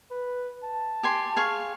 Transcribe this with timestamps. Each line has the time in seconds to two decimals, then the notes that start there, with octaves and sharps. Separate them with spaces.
0.11 B4
0.64 A5
1.03 G4 G#5 C6
1.36 G#4 F5 C#6